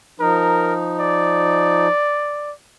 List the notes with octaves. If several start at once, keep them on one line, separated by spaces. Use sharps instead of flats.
F3 D#4 A#4
D5